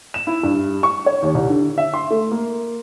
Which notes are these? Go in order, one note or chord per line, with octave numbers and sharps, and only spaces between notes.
E7
E4
G2
C#6
C#5
D#2
C2
D3
E5
C6
A3
A#3